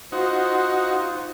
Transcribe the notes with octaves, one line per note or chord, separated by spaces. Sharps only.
D#4 F4 F#4 C5